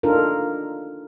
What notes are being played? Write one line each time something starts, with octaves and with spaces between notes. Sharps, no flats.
D4 D#4 F4 A4 A#4